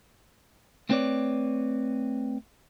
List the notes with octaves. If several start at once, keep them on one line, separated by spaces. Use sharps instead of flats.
A3 B3 C4 B4 C#5 D5